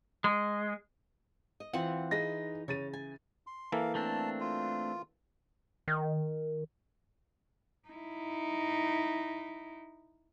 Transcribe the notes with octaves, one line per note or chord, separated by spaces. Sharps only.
G#3
D#5
E3 C4 F4 F#5
D#4 G#4 B4 A#6
C#3 C#5 A6 D#7
G#5
C6
E3 A#3 A4 F5
A3 C4 D4 A5
F4
D#3
D#4 E4